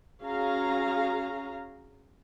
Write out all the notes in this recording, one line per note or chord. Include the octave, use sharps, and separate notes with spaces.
C#4 F#4 G#4 F5 A#5